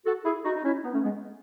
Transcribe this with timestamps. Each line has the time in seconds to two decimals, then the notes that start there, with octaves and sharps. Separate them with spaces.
0.05 F#4 A4
0.25 E4 G#4
0.45 D#4 F#4
0.56 D#4
0.64 C#4 E4
0.84 B3 D#4
0.93 A3 C#4
1.03 G#3 B3